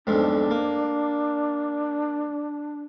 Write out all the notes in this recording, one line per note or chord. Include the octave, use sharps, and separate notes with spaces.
B1 F2 G#2 D4
A#3